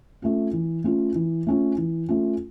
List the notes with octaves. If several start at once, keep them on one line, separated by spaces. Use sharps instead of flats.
A3 C#4 F4
E3
A3 C#4 F4
E3
A3 C#4 F4
E3
A3 C#4 F4